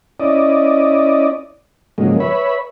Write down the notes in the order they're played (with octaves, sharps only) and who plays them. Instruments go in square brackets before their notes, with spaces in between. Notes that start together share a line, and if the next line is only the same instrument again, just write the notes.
[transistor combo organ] C#4 E4 D5 D#5
G#2 C#3 F3 F#3 G#3 A#3
B4 C#5 E5 B5